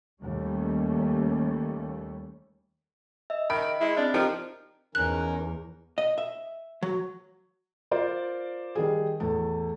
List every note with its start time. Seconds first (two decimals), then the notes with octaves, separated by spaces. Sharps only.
0.22 D#2 G3 A3 C#4
3.30 D#5 E5
3.50 D#3 B5 D7
3.81 G#3 E4
3.97 C4 D4 F6 F#6
4.14 F3 D#4 G4 A#4
4.95 E2 C#4 D#4 A#4 F#6
5.98 D#5
6.18 E5
6.83 F#3
7.91 F4 A#4 C5 D5
8.75 D#3 G3 G#4
9.20 E2 A2 A4